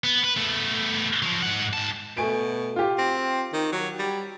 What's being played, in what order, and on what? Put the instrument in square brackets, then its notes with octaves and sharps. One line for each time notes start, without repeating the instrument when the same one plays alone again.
[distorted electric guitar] B3
B4
A3 B3
F3 F#3
G#2 F#5
G#2 A5
[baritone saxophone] B2 [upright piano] A3 G#5 D7
[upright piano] F4 G4
[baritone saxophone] C4
D#3
F#3
G3